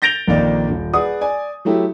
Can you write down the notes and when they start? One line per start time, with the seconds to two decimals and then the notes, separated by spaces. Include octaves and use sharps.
0.02 G6 A6 A#6 D7 F7 G7
0.28 A#1 F2 D#3 A#3 D5
0.69 D#1
0.94 G#4 B4 D5 F#5 D#6
1.21 D5 G#5
1.65 F#3 A3 E4 G4